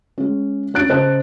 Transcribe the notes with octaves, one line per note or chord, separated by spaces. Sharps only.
G#3 C#4
C#4 D4 F#6 A6 D7
C#3 C#4 C5 D#5 A5 F#6